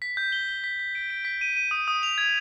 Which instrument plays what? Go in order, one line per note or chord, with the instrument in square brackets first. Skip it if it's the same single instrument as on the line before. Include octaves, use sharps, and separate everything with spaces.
[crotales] B6
G6
G7
G7
B6
B6
D7
D7
B6
D#7
D#7
D#6
D#6
F7
G#6